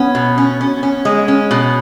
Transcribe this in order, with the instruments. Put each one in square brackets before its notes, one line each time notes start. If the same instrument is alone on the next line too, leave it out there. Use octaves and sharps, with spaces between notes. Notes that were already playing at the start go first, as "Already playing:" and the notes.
Already playing: [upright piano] B3 [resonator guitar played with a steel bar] C#4
[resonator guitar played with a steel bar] B2
C#4
C#4
C#4
G#3
C#4
B2